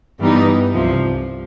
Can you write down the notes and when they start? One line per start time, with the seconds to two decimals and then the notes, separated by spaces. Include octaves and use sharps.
0.19 G2 E3 G3 B3 D#4
0.73 C2 C3 F3